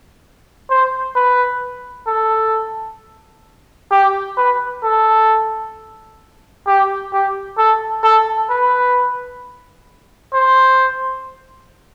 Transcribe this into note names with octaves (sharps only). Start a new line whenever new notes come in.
C5
B4
A4
G4
B4
A4
G4
G4
A4
A4
B4
C5